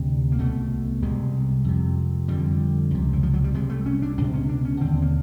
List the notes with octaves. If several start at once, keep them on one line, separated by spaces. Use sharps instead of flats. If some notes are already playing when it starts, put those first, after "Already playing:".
Already playing: D2 C3 D4
A#3
C2 B2 A3
C2 C3 G#3
F2 C3
F2 D3 G3
C#2 C3
E3
F3
F#3
G3
C2 C3 G#3
A3
C#4
D4
C#2 B2 D4
C#4
D4
C#4
D#2 D3 C4
A#3